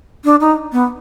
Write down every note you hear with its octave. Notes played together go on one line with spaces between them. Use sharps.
D4
D#4
B3